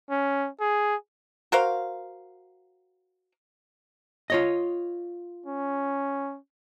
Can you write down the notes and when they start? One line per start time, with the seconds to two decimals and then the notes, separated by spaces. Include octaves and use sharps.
0.10 C#4
0.60 G#4
1.52 F#4 A#4 C5 F5
4.30 F4 C#5 D#5
5.46 C#4